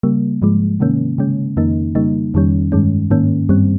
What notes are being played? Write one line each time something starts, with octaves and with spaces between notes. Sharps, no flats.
C#3 G3 A#3
G#2 F3 G#3
C3 D#3 A#3 C#4
C#3 G#3 C#4
F2 D#3 A#3 D#4
C#3 G3 A#3 D#4
F2 D#3 G3 C#4
G2 D#3 G#3 C#4
G#2 D#3 A#3 C#4
G2 G3 C4